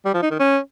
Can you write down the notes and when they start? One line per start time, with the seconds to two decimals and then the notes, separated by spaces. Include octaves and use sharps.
0.05 G3
0.14 F3
0.22 D#4
0.31 D#3
0.39 C#4